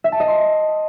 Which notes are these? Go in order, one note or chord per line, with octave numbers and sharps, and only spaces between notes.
E5
A5
D#5
C6